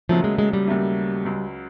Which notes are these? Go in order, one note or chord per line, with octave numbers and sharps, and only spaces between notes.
D#2 C#3 F3 F#3 A3
G#3
G#3
G3
D#2 C#3 F#3 A3
C#2 C#3 F#3